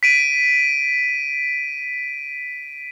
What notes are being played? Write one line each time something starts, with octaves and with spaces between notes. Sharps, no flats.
B6 D7 D#7